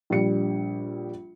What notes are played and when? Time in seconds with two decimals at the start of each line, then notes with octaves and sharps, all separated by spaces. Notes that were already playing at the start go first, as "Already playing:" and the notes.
0.10 A#1 G3 C#7